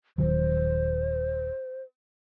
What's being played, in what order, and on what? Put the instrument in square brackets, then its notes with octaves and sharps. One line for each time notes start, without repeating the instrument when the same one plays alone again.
[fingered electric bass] D#1 D#3 F#3 [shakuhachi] C5